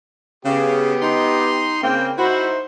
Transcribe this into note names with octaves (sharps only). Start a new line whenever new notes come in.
C#3 B3 G4
D#4 C6
C#3 A#3 C4 G5
D#4 E4 F#4 C5